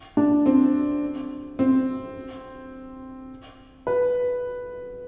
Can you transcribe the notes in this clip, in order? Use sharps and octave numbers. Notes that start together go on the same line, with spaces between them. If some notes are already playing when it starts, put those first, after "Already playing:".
D4
C4
C4
B4